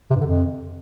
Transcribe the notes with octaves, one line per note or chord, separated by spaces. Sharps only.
C3
G2
D3
F2